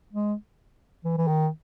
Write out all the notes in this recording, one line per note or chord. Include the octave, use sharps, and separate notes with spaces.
G#3
E3
E3
D#3